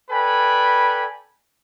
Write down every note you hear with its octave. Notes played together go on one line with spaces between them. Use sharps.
A4 B4 D5 G5 G#5 B5